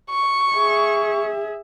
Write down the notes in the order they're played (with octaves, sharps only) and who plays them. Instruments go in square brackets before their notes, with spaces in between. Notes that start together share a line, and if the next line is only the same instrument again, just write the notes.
[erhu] C#6
[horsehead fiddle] G#4 E5